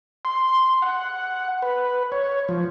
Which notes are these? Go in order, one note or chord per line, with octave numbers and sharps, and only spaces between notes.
C6
F#5
B4
C#5
F3